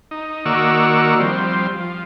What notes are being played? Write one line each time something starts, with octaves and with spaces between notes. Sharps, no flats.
D#4
D#3 A#3 F#4 D5 C#6 E6
F3 G3 C4
F3